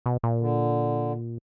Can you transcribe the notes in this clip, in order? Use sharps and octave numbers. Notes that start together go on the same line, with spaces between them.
B2
A#2
D3